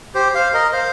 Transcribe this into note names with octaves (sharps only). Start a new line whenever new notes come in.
G4 C5
C5 F5
A#4 D#5
C5 F5